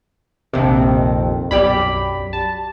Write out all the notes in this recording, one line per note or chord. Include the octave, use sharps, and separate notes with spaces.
A#1 F2 C3 D#3
B1 F#2 G3 G4 B5
A5